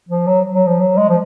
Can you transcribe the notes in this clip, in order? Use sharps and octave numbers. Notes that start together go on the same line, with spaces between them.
F3
F#3
F#3
F3
F#3
G#3
F3